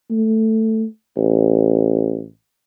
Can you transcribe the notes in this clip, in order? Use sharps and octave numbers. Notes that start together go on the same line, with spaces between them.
A3
A1